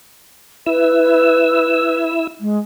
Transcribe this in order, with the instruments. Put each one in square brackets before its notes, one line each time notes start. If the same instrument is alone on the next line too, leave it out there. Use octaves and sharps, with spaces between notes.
[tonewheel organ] E4 E6 [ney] B4
[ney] G#3